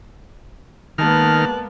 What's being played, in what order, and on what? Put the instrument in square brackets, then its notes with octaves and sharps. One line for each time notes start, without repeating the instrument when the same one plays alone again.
[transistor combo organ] D#3 F6 [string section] G#3 A#3 B3 [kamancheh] A5 F#6